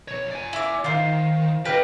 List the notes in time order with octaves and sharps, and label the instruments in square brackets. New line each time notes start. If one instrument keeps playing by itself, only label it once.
[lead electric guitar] B1 C#5
D5 G#5
[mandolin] E4 D6
[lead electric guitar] D#3 [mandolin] F4 C5
[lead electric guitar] F4 D#5 [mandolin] G4 B4 F6